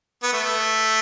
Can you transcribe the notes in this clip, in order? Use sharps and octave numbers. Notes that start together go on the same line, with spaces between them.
B3
A3